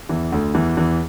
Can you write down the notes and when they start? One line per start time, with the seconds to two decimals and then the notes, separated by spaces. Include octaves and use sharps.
0.09 E2 E3
0.32 D2 D3
0.54 E2 E3
0.77 E2 E3